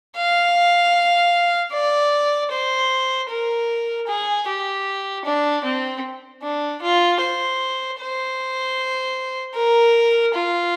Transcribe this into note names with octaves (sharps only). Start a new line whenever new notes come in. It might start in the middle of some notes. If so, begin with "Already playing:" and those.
F5
D5
C5
A#4
G#4
G4
D4
C4
D4
F4
C5
C5
A#4
F4